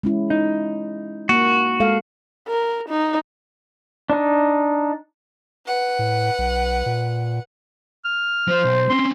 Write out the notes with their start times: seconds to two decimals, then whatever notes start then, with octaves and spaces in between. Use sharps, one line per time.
0.03 G#3 C#4 E4
0.30 D#4
1.29 A#3 F#4
1.80 G#3 A4 F5
2.48 A#4
2.89 D#4
4.10 D4 D#4
5.66 B4 F#5
5.99 A2
6.38 B1
6.86 A#2
8.05 F6
8.48 F3 C5 F5
8.64 B1
8.90 C4 C#4 C6